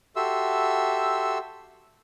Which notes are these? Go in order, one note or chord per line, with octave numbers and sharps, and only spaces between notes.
F#4 G4 A4 E5 C6 E6